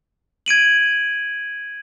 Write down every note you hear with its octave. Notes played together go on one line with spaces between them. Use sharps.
G#6 D7 D#7 F#7